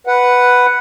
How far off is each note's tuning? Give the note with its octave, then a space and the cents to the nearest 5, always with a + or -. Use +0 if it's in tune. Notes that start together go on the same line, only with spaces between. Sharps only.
B4 +0 F#5 +0